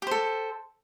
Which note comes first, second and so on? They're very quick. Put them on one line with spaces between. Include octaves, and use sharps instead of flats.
G4 C5 A4